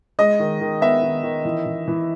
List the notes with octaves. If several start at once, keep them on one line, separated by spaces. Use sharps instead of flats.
G#3 D#5
D#3
D#3
B3 E5
D#3
D#3
E3
E3
E3